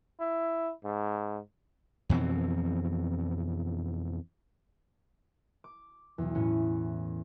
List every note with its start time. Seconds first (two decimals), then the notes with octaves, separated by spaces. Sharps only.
0.20 E4
0.84 G#2
2.09 F2 B2 E3 C4
5.64 D6
6.18 B1 E2
6.35 A2 B3 C#4